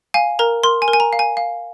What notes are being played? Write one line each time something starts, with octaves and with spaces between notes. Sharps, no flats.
F5 G#5
A#4 A#5
A#4 C6
G#5
A#4
G#5
A#5
F5
G#5
F5